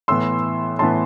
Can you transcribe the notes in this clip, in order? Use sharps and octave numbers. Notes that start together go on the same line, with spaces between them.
A2 E3 B3 C6 E6
A2 E3 B3 A5 C6